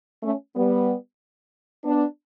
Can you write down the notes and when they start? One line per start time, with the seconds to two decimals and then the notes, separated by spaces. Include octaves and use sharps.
0.22 A3 C#4
0.55 G3 B3
1.84 B3 D4